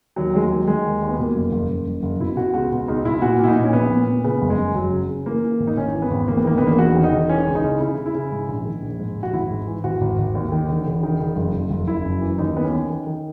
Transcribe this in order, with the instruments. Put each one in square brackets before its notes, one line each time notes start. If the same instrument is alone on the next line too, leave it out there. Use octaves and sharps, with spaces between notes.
[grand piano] D#2 F#3
D#2 G#3
F#3
D#3
D#3 G#3
D#2
D#2
B3
B2 A#3
F#1
F#1
F#1
F#1
F#1
B2 E4
B2 F#4
C#2 F#4
B2
C#2 D#4
B2 E4
A#2 F#4
A#2 E4
D#4
A#2
C#4
A#1 B3
A#2
A#2
C#3 B3
F#1
G#3
F#1
F#1 F#3
C#3
C#3
E3 A#3
E3
G#1
D#4
G#1 C#4
E3
B3
G#1
E1 A#3
B3
D#3 A#3
E1 B3
A#3
E2 F#4
D#3
D#4
E1
E3 C#4
C#2
D#4
C#3
C#3 E4
C#3
E4
C#3
G#2
A#1
D#3
A#1
G#2
A#1
F#4
G#1 E4
G#2
E3
G#1 F#4
G#1
G#1
D#2
D#3
E1
E1
D#3
E1
F#1
F#1
F#1
F#1 E4
F#2
E3
D#2 D#4
D#3 B3
C#4
D#3
D#3
D#3